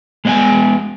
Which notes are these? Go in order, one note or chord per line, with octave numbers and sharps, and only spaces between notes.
G#3 B3 D4 G5 G#5